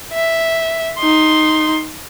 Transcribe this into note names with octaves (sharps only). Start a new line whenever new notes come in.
E5
D#4 C6